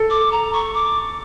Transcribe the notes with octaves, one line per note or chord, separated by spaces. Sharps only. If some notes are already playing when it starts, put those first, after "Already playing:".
Already playing: A4
D6
A#5
C#6
D6